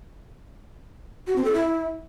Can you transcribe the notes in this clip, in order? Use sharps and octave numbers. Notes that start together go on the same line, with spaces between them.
F#4
C4
A4
E4